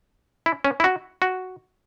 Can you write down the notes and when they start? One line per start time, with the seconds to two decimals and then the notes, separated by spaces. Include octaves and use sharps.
0.46 E4
0.65 C#4
0.80 E4
0.84 F#4
1.22 F#4